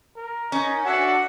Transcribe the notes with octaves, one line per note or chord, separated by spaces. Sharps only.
A#4
C#4 D#4
D4 F#4 A4 E5 F#5